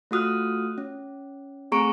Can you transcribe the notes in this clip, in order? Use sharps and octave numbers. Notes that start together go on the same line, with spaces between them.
A3 F4 F#4 D#6 F6 F#6
C#4
A3 C4 G#4 A#5 C#6 D7